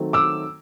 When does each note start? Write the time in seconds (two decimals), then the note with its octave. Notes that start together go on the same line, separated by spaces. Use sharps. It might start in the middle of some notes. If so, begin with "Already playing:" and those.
Already playing: D#3 F#3 A3 C4
0.13 D6 E6